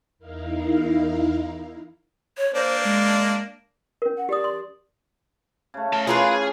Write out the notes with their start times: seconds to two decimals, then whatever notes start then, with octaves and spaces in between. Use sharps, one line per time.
0.19 E2 D#4 E4 A#4 F5
2.37 C#5
2.54 A#3 D4 C5
2.84 G#3
4.02 C#4 A#4
4.17 F#5
4.29 G4 D5 D#6
4.44 C6
5.74 C#3 A3
5.93 A#4 A5
6.07 C#3 E3 C#4 F4 G#4 A#4 B4